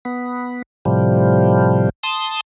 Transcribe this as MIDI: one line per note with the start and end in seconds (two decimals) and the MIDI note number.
0.05 0.62 59
0.85 1.89 45
0.85 1.89 48
0.85 1.89 53
0.85 1.89 55
2.03 2.40 81
2.03 2.40 84
2.03 2.40 87